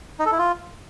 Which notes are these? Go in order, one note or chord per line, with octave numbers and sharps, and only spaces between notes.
D#4
A4
E4
F4